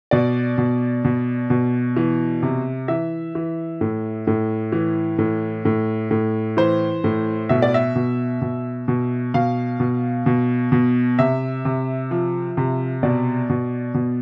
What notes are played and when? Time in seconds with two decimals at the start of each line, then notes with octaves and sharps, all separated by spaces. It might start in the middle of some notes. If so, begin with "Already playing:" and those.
0.11 B2 D5
0.58 B2
1.05 B2
1.50 B2
1.97 E3
2.43 C3
2.88 E3 E5
3.35 E3
3.81 A2
4.27 A2
4.72 E3
5.19 A2
5.65 A2
6.11 A2
6.57 E3 C5
7.04 A2
7.49 B2 E5
7.62 D5
7.74 E5
7.96 B2
8.42 B2
8.88 B2
9.34 B2 F5
9.80 B2
10.26 B2
10.72 B2
11.19 C3 E5
11.65 C3
12.11 F3
12.57 C3
13.03 B2 D5
13.50 B2
13.94 B2